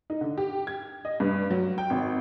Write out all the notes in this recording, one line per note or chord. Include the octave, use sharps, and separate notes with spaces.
D#4
D3
G4
G#6
D#5
G2
F#3
G5
G#1